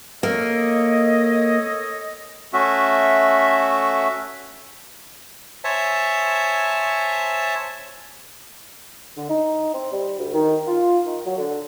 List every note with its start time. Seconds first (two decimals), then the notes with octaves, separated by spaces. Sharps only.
0.23 A#3 A4 C#5 D#5
2.53 A3 C#4 F#4 E5
5.64 C5 C#5 E5 G#5 A5
9.17 D3
9.29 D#4
9.74 C4
9.92 G3
10.18 D2
10.33 D#3
10.67 F4
11.06 D#3
11.25 F#3
11.38 D3